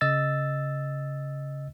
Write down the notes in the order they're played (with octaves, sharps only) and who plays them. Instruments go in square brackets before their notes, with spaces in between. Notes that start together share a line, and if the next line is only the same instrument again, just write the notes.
[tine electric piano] C#3 D#5 E6 A6